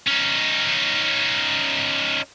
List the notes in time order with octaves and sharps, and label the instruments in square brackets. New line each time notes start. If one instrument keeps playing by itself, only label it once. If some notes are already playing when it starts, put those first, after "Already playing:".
[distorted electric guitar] C#4 D#4